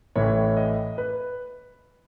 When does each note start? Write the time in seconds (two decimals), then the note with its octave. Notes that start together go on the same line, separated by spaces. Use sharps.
0.16 A1 A2 E3 C#5
0.57 D#5
0.98 B4